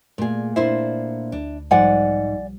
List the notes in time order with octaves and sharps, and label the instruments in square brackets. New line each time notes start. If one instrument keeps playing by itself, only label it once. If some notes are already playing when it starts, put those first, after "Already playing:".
[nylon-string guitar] A#2 G#4 [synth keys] A3 D5
[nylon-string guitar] A#2 D4 C5 [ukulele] E4
[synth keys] D2 [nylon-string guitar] D4
[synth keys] B1 F3 G3 [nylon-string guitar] G#2 [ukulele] D5 F#5 G#5